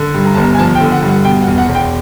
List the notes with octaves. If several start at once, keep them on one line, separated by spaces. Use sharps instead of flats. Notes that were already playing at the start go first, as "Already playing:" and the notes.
Already playing: D3
G2
A#5
G1 A5
A#5
G#5
F3 A5
G5
D3
F#5
G2
F#5
B2 G5
F#5
E2
F#5
E1
G5